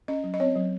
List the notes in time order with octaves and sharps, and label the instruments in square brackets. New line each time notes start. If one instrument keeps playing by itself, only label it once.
[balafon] C#4 D#5
F#3
D#5
C4 C#5
F#3